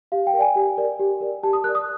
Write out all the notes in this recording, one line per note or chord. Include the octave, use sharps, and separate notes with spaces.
G4 F5
G5
A#4
D5 G#5
G4
A#4 D5
G4
A#4 D5
G4 A5
D#6
A#4 D5 F#6
D#6